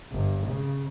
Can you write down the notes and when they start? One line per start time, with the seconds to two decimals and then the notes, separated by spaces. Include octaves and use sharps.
0.12 G1
0.47 C#3